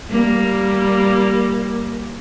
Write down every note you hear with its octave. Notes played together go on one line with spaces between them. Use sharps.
G3 A#3